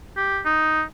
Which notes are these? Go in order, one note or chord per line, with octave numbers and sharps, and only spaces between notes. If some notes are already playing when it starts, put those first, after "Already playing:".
G4
D#4